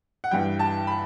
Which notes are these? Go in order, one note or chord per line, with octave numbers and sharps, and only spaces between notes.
F#5
G2 E3 G3 G5
A5
B5